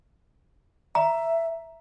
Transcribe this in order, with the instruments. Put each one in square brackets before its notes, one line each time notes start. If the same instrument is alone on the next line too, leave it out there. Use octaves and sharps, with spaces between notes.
[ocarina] E5 [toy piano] A#5